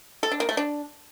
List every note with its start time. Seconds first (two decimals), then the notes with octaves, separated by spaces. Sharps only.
0.23 A4
0.32 D4
0.40 A#3
0.49 A3
0.57 D4